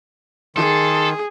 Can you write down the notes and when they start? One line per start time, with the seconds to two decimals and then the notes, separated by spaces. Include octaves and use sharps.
0.56 D#3 G#4 A4 C6